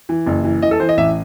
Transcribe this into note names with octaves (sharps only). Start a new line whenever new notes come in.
E3
F#1
E3
E3 D#5
A4
E3 C5
D#5
A1 E5